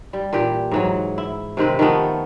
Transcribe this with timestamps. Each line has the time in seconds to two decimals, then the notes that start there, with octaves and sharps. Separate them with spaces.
0.13 G3
0.33 A#2 E3 G4
0.71 G#2 E3 F#3
1.18 E4
1.57 C3 D#3 C4 B4
1.79 D#3 F3 A3 B3